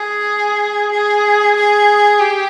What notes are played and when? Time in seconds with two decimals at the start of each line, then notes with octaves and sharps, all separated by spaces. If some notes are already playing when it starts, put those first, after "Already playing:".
Already playing: G#4
0.92 G#4
1.56 G#4
2.19 G4